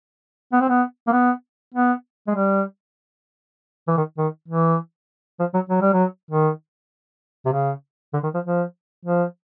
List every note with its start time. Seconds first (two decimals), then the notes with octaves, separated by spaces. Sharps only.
0.53 B3
0.61 C4
0.69 B3
1.07 A#3
1.12 B3
1.74 B3
2.27 G#3
2.35 G3
3.87 E3
3.97 D#3
4.18 D#3
4.48 E3
5.39 F3
5.54 F#3
5.69 F#3
5.81 G3
5.93 F#3
6.31 D#3
7.46 C3
7.52 C#3
8.13 D3
8.23 D#3
8.34 F3
8.44 F3
9.05 F3